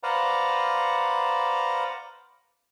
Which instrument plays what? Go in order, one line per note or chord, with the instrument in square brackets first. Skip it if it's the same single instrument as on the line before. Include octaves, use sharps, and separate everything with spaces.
[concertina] B4 C5 D5 F5 F#5 A#5